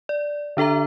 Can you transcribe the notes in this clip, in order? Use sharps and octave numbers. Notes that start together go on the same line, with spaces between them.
D5
D3 D4 A4 E5 A#5